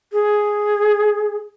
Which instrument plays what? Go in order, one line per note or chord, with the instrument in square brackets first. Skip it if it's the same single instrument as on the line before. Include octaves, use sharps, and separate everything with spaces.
[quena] G#4